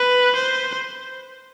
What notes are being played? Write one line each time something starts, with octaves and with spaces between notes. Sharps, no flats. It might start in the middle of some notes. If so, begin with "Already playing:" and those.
Already playing: B4
C5